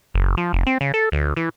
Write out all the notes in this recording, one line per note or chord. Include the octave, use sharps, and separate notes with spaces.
F#1
F3
F1
C4
C#3
A4
D2
E3